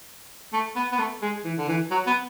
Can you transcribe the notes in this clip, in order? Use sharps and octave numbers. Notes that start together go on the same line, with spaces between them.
A3
B3
B3
A3
G#3
E3
D3
E3
F#3
B3